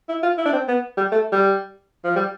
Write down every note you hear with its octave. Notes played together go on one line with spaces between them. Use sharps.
E4
F4
E4
D4
C4
B3
G3
A3
G3
F3
G3